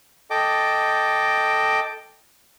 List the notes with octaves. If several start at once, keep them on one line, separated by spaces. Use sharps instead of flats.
A4 D#5 G5 D6